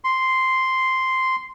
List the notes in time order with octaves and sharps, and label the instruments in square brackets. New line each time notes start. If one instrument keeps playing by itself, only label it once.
[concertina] C6